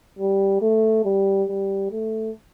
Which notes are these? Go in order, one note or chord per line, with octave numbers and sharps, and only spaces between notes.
G3
A3
G3
G3
A3